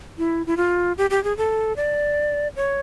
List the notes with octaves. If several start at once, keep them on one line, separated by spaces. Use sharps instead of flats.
E4
E4
F4
G4
G4
G#4
A4
D5
C#5